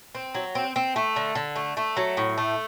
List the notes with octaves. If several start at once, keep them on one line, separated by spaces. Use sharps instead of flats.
C4
F#3
C4
C4
A3
D3
D3
A3
A3
F#3
A2
A3